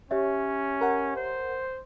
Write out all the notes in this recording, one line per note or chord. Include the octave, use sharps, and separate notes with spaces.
C#4 G4 C#5 E5
A#4 F#5
C5